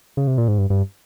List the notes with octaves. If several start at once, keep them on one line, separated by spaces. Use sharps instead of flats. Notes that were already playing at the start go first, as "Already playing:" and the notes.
C#3
C3
A#2
G#2
G2
G2